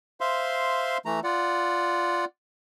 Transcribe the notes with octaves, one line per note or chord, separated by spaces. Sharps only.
C5 E5 F5 C6
E3 A3 A#5
F4 D5 F#5